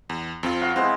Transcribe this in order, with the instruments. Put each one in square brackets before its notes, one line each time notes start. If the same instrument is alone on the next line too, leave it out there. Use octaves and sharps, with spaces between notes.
[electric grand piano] E2
F2 C4 F4
[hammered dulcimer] F#4 F5
[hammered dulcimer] E3 G#3 B3 [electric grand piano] C4 C5